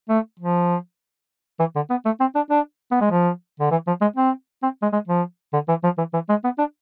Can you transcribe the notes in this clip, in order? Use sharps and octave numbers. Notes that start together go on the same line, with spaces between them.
A3
F3
E3
D3
B3
A3
C4
D4
D4
B3
G#3
F3
D3
E3
F3
G#3
C4
C4
G#3
G#3
F3
D3
E3
F3
E3
E3
G#3
B3
D4